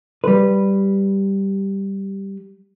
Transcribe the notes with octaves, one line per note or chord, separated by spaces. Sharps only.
G3 B4